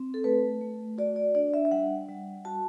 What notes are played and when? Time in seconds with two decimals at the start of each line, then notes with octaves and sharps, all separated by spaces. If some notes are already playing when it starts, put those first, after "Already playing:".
Already playing: C4
0.14 A4
0.24 A3 B4
0.61 A3
0.98 F#4 D5
1.16 D5
1.35 D4 D5
1.54 E5
1.65 E5
1.71 G3 F#5
2.08 G3
2.45 F#4 A5